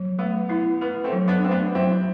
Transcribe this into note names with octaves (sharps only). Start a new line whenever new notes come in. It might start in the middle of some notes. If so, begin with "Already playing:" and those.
Already playing: F#3
A3 B3
B3 E4
B3 B4
A3 C4
F#3
B3 D4
A3 C4
B3 D4
F#3 C4 E4